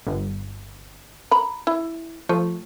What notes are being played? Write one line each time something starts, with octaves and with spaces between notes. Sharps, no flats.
G1
A#5 B5
E4
F3 A3